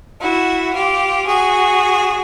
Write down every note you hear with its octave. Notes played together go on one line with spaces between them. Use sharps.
E4 F#4
F4 G4
F#4 G#4